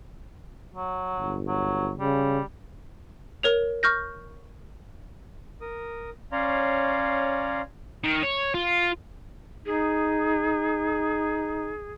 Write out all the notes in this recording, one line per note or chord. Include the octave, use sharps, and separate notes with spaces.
F#3
G1
F#3
C#3 G3
A#4 C#5 F7
C#6 F6 G6 A#6
A#4 D#6
C#4 C#5 D5 F5 A#5 C6
D#3
C#5
F4
D#4 G#4